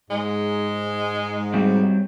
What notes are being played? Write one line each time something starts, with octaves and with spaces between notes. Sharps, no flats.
G#2 G#3
F#3 G3 C4